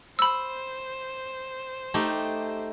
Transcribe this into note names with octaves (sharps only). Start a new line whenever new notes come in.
C5 B5 E6
A3 D#4 G4